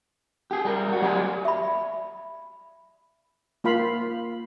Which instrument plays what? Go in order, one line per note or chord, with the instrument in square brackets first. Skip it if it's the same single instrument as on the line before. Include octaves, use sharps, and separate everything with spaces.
[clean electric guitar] G4 G#4
G3 A#4
G3 F#4
F#3 G4 D5 G5 G#5
[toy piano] E5 B5
[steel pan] A#3 F4 F5 B5